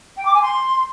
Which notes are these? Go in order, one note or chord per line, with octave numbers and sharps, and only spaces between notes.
G5
D6
G#5
C6